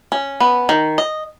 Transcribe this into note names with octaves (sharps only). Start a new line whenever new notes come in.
C#4
B3
D#3
D#5